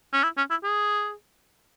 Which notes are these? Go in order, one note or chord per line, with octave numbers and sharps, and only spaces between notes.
C#4
E4
C#4
E4
G#4